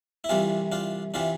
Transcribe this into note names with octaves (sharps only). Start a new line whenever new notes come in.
E4
C2 C3 E3 D4 F4
D4 F4
C3 E3 D4 F4